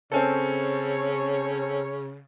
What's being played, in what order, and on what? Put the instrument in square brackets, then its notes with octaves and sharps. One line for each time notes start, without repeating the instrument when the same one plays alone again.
[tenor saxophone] C#3 [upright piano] C4 C#4 A4 [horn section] C#5